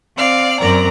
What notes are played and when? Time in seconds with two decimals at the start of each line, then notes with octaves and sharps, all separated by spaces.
0.17 C4 D5 F5
0.59 F#2 C4 A#4 D5 A#5